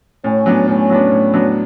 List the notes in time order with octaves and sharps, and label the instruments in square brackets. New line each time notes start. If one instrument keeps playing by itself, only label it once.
[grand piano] A2 [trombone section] C#4
[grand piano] F#3 B3 D4
[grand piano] A2 [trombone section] C#4
[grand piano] F#3 B3 D4
A2
F#3 B3 D4